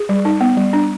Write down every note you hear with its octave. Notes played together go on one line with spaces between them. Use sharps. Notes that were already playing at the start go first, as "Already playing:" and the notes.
Already playing: G#4
G3
D#4
B3
G3
D4